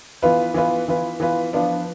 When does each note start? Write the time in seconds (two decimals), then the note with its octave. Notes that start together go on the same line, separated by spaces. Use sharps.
0.22 E3 B3 F4 B4
0.54 E3 B3 F4 B4
0.88 E3 B3 F4 B4
1.20 E3 B3 F4 B4
1.53 F3 B3 D4 F4